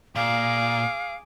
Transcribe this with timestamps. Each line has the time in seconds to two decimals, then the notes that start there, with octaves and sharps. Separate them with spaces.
0.16 A#2 G#4 F5 D6